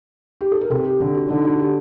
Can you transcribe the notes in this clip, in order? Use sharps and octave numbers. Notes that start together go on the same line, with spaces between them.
G4
A4
A#4
C3 A4
G4
D3 G4
F#4
D3 D#4
F#4
G4